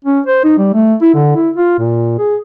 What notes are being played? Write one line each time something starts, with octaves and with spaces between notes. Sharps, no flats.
C#4
C5
D#4
G3
A3
E4
D3
E4
F4
A#2
G#4